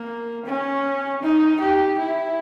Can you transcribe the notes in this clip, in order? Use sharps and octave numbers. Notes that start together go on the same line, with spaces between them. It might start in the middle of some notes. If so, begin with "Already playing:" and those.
Already playing: A#3
C#4
D#4
G4
E4